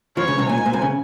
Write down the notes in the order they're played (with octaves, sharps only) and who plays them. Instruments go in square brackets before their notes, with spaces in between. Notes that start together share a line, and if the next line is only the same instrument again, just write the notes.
[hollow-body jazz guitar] F2 F3 [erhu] C#5
[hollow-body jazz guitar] C#2 C#3
C2 C3
[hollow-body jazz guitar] A#2 [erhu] G#5
[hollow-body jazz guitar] G#2
A#2
C2 C3
C#3